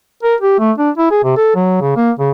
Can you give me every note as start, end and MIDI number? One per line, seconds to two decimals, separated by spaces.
0.23 0.35 70
0.41 0.57 67
0.59 0.72 57
0.78 0.90 62
0.97 1.09 64
1.11 1.21 68
1.24 1.35 48
1.37 1.53 69
1.55 1.81 54
1.81 1.95 49
1.96 2.11 58
2.19 2.31 49